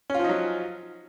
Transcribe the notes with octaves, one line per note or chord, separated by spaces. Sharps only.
F3 F#3 C#4 D#4 F4